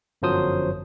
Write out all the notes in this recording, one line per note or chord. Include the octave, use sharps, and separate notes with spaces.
G1 F#2 F3 F#3 C5 D#6